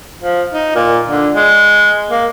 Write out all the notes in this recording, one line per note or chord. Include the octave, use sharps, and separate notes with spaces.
F3
D#4
A#2
D3
G#3
A#3